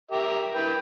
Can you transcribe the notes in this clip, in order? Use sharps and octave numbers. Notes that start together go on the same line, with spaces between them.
G4 A#4 E5
E4 B4 G5